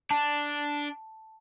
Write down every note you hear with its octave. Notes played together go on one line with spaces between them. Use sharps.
D4 A5